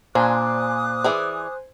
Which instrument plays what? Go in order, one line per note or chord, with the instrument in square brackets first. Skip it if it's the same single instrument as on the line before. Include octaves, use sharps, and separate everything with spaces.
[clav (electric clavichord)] A#2 [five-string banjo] D4 [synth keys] C5 G#5 [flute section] D6 D#6 F#6
[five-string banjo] E3 G#4 D5